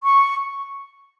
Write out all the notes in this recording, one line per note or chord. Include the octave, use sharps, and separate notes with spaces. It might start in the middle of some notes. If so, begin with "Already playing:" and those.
C#6